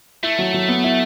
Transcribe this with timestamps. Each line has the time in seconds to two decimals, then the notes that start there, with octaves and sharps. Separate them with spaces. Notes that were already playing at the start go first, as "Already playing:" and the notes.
0.23 A3 E4
0.38 F#3
0.54 F#3
0.68 B3
0.84 E4